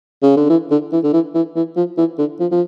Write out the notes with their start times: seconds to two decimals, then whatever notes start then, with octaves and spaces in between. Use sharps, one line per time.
0.23 C#3
0.37 D3
0.49 E3
0.71 D3
0.93 E3
1.04 D3
1.13 E3
1.35 E3
1.56 E3
1.76 F3
1.98 E3
2.18 D3
2.40 F3
2.52 F3